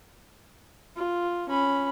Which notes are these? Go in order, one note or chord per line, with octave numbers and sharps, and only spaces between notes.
F4
C#4 B5